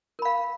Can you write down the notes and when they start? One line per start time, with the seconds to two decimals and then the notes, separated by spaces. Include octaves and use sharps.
0.19 A#4
0.22 B5
0.25 F5